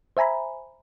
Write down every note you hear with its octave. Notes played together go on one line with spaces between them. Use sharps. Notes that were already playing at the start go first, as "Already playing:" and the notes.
C5 E5 G#5 A#5 B5